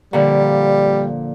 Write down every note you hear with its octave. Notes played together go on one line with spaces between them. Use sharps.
A#2 D3 F3 G3